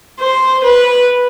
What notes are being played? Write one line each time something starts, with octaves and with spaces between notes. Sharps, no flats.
C5
B4